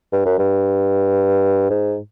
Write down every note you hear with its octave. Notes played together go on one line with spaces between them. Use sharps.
G2
F#2
G2
G#2